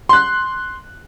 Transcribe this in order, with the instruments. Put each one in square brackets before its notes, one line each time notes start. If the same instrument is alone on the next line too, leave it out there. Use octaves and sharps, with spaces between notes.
[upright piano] C6 F#6